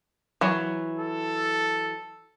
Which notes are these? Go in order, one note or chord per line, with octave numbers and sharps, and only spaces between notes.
E3 F#3
A4